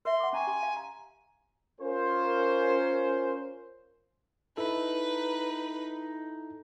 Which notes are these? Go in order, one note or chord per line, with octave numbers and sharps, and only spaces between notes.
A#4 E5 C6
F#5 D6
C#4 G#5 A#5 C#6
G4 C6
F5
A#5
C#4 F4 A#4 C5
D#4 E4 A4 B4